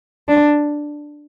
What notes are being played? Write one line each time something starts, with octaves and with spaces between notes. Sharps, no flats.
D4